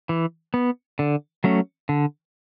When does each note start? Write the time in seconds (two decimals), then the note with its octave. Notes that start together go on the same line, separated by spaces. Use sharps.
0.09 E3
0.54 B3
0.99 D3
1.44 F#3 A3 C#4
1.89 D3